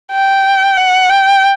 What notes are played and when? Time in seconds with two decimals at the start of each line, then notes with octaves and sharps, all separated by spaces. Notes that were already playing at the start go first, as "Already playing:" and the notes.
0.12 G5
0.77 F#5
1.10 G5